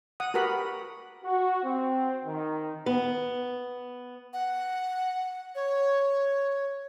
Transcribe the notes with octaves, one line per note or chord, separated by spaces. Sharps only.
F#5 D#6
F#4 G4 A#4 B4 B5
F#4
C4
D#3
B3
F#5
C#5